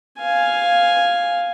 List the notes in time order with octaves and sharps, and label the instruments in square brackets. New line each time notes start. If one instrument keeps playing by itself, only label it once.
[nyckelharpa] F5 G#5